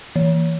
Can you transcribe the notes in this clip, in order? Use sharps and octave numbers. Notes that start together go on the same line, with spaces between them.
E3